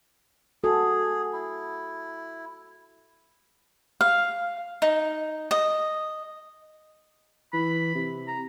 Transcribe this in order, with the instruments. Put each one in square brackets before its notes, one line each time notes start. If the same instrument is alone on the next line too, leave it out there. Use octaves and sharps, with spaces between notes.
[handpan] F#4 A4 [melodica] G#4
[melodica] E4
[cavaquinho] F5
D#4
D#5
[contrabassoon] E3 [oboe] B5
[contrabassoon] C3
[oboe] A#5